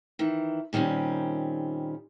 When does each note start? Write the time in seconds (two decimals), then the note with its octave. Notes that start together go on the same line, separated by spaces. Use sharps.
0.19 D#3 E3
0.73 A#2 D#3 G3 C4 C#4